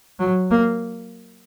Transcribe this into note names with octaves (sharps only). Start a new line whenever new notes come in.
F#3
A#3